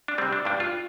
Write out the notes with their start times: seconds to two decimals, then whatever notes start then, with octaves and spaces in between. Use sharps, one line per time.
0.08 D4
0.18 C3 G3 C4
0.33 D4
0.45 G2 G3 D4
0.60 F4